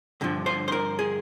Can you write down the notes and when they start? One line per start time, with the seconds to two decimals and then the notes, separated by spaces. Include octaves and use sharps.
0.21 G2 D3 F3
0.46 C5
0.68 C5
0.72 A#4
0.99 G#4